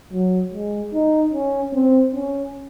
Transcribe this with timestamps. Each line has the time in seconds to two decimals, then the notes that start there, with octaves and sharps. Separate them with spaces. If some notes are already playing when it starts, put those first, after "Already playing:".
0.13 F#3
0.53 G#3
0.93 D#4
1.34 C#4
1.74 C4
2.15 C#4